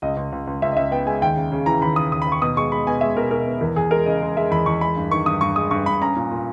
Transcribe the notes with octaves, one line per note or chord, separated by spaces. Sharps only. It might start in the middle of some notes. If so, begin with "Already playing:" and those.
C#2 D#5
C#2
C#2
C#2
C#2 E5
D#5
C#2 E5
B3 G5
G#3 G#5
D#2 G5
C#3
C#3
E3 A#5
D#2 B5
C#3 D#6
D#2 D#6
B5
D#2
C#6
B2 D#6
G#3 C#6
G#3 B5
B2 G#5
G#3 E5
B2 A#4
B2 A#4
B3
E2 A#4
E2 G#4
G#3 A#4
C#3 D#5
G#3
G#3 E5
E2 B5
E2 C#6
G#3 B5
G2
D#3 C#6
G2 D#6
G2 C#6
G#3 D#6
G2 C#6
G2 B5
C#4 A#5
A#2
A#2